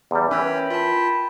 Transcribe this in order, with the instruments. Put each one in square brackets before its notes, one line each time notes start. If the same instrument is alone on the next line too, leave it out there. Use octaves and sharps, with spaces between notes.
[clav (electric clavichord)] E2 G3
[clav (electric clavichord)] E3 [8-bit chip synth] C#4 C#5 [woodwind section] A#4 G5 B5
[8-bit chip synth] F4 A5